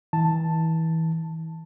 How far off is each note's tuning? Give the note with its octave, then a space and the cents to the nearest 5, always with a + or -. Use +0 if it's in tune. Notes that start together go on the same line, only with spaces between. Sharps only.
E3 -30 A5 +5